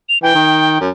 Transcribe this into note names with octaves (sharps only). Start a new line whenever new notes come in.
F7
E3 G5
D#3
F#2